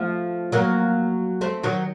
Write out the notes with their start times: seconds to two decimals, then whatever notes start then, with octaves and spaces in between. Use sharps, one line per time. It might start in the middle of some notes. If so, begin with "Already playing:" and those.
Already playing: F3 A3
0.52 F#3 A#3
1.41 A3 C4
1.63 D#3 F#3